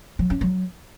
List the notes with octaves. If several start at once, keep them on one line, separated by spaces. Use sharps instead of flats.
F#3
C#4
F#3